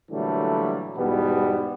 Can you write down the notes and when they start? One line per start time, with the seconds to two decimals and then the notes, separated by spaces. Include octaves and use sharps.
0.10 A#2 D3 E3 F#3 G3 A3
0.96 E2 G#2 B2 G3 B3